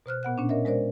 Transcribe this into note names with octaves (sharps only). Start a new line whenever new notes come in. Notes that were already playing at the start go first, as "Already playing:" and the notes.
B2 C5 F6 F#6
A#2 B3 F#5 F#6
A#2 C#4 D4
A#4 C#5 D#5 E5
G#3 A#4 C5 D5